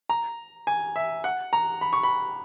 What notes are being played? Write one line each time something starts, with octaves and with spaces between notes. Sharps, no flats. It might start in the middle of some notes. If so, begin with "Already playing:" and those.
A#5
G#5
E5
F#5
A#5
B5
C#6
B5